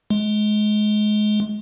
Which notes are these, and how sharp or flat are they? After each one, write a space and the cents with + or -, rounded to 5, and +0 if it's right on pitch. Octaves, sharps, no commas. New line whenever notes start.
G#3 +30